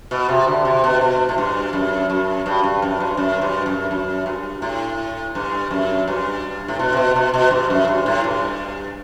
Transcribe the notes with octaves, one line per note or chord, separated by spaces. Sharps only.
B2
C3
D3
C3
B2
B2
A2
G2
F#2
F#2
G2
G2
F#2
G2
F#2
G2
F#2
F#2
G2
A2
G2
F#2
G2
A2
B2
C3
B2
B2
B2
G2
F#2
G2
A2
G2